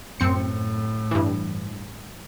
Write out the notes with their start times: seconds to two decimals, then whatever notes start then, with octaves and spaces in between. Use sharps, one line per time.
0.20 F#2 A2 C4 C#7
1.11 G2 E3